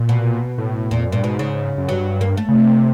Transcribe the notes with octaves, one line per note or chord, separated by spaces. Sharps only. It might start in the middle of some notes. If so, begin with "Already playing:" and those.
Already playing: A#2
B2
A2
E2 A#2
F2
F#2
G2 A#2
G#2 B2
C#3
F#2
G2 F#3
A#3
A3
C#3
C3